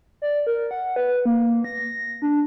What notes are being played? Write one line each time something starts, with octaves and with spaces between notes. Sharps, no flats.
D5
A#4
F#5
B4
A#3
A#6
D4